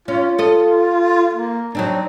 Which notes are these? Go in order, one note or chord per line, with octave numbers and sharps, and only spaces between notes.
C#4 F4
A4 D#5
A#3
F#3 C4 D4 D#4